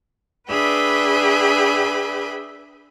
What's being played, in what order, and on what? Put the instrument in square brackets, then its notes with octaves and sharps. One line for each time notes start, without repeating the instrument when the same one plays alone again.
[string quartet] D4 G#4 B4 E5 G5 B5